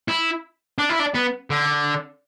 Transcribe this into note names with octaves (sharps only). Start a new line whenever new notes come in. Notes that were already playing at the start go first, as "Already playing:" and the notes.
E4
D4
E4
D4
B3
D3